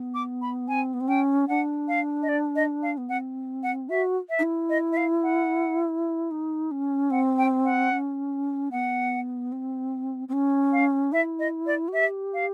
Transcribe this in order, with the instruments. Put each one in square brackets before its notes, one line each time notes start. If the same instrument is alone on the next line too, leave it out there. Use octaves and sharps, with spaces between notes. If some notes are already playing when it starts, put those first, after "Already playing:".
Already playing: [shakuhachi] B3
[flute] D6
B5
[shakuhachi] C4 [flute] G#5
[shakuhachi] B3
C4
[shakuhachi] C#4 [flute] G5
[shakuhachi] D4 [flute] F#5
[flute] F5
D#5
D5
D#5
F5
[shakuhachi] B3
[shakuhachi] C4 [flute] F#5
[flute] F#5
[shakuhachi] F#4 [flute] E5
[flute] E5
[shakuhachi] D#4
E4
[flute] D#5
E5
F5
F#5
[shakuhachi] D#4
C#4
[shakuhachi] C4 [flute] F#5
[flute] G5
F#5
[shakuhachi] C#4
[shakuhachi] B3 [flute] F#5
[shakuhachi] C4
C4
C#4
[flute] F5
[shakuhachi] E4 [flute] E5
[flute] D#5
D5
[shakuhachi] F#4
[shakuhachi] G4 [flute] E5
[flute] F5